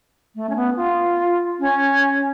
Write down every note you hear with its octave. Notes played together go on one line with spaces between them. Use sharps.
A3
C#4
B3
F4
C#4